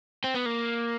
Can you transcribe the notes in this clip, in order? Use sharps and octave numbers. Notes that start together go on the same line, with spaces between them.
C4
B3
A#3